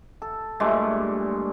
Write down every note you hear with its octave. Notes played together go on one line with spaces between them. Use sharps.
A4
G2 A#2 G#3 A3